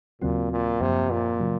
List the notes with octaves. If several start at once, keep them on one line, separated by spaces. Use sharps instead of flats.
D#2 A#2 C#3 F#3 C4 F#4
A#2
F#2 C3 F3 A#3
A#2
C#3 F#3